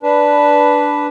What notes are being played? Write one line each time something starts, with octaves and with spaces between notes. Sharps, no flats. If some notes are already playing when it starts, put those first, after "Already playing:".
D4 B4